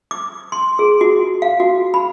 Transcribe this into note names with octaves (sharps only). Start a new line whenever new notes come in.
D6
C6
G#4
F#4
F5
F#4
B5